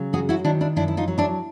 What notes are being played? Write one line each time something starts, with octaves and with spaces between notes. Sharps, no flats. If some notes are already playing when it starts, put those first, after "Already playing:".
Already playing: C#3 F#3
F#2 F#4 G#4
E4 F#4
D#3 D4 E4
D4 E4
F#2 D4 E4
E4
D#4 F4
F#3
D4 E4